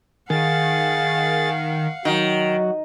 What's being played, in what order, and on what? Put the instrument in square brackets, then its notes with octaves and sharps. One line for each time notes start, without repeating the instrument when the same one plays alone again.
[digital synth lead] D#3 [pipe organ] G#4 A6 [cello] F5 F#5
[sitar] D#3 [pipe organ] F#3 F#4